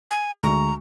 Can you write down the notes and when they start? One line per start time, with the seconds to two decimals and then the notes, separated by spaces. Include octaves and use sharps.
0.11 G#5
0.43 D2 G#3 A#5 C#6